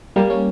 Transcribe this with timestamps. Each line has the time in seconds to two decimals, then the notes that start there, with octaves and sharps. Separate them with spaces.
0.16 G3 A#3
0.30 A#3 C#4